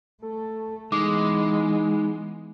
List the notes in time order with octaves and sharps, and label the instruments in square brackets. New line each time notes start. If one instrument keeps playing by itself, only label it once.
[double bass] A3 [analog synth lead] A4
[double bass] E3 B3 [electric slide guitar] G#3 [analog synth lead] D#4 [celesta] D6